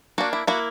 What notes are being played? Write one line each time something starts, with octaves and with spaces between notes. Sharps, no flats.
A#3 D4 F#4
E4
A#3 E4 F#4